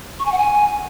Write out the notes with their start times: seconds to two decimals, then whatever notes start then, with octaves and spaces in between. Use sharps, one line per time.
0.19 C#6
0.26 G#5
0.32 F#5
0.38 G#5